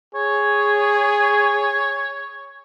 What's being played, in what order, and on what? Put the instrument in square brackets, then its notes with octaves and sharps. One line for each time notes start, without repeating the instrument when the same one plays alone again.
[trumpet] G#4 [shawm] C#5